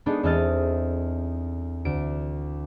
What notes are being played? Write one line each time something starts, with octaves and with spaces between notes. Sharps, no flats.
G#3 B3 D4 D#4 A4
E2 C4 A4 D#5 F6 A6
D2 D7